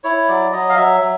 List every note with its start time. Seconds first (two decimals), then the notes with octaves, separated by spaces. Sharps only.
0.04 E4 C#5
0.28 F#3 D5
0.53 F#3 D#5
0.69 F5
0.77 F#3 E5
1.01 F#3